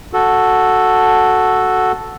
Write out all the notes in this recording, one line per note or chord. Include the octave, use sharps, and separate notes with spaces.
F#4 A4